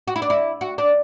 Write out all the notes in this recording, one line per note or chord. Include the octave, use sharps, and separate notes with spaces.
F#4
E4
D4
E4
F#4
D4